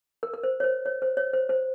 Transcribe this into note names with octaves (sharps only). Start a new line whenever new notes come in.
A#4
A#4
C5
C#5
C5
C#5
C5
C#5
C5
C5